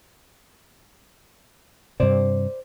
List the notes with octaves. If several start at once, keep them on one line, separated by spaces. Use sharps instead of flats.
G2 C3 C5 D5